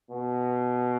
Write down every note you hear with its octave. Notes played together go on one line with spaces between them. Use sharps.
B2